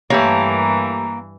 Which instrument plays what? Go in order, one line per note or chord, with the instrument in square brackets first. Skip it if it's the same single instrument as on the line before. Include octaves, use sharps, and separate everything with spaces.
[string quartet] G2 E3 [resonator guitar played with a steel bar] A3 G4 C#5 [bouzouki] A#3